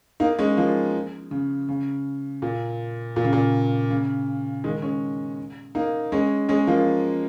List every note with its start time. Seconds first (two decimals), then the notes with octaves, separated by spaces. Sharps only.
0.20 A#3 D#4
0.39 G#3 C#4
0.57 F3 A#3
1.31 C#3
1.69 C#3
2.42 A#2
3.16 A#2
3.24 C#3
3.33 A#2
3.90 C#3
4.64 D#3 G#3
4.82 G#3 C#4
5.75 A#3 D#4
6.12 G#3 C#4
6.49 G#3 C#4
6.67 F3 A#3